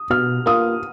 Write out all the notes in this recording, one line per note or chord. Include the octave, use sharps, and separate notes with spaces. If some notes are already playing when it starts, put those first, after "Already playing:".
Already playing: D#6
B2 F6
A#3 F4 D#6